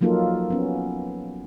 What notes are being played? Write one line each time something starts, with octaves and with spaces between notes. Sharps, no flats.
F3 F#3 A#3 D#4 F4 A4
B3 C#4